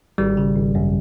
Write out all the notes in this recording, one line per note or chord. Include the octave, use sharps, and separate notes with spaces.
G#1 G3
C#3
G#1
F#2